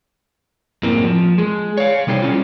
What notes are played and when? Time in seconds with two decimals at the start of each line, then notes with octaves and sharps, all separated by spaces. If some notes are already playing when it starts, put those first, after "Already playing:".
0.83 F#2 A2 A#3 C4
1.03 F3
1.38 G#3
1.77 C#5 F5
2.07 C3 G3 D#4 A#4 C5
2.22 G3 G#3 C#4 F4